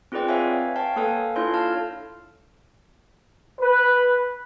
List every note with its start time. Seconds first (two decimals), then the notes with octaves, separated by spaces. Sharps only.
0.12 C4 F4 G#4 B4 D5 G5
0.28 B4 C#5 E5 F5 G#5
0.76 C#5 F5 G5 A5
0.96 A#3 A4 B4 F5 G#5
1.36 D4 E4 F4 A4 C#5 C6
1.54 F5 A5 F6
3.61 B4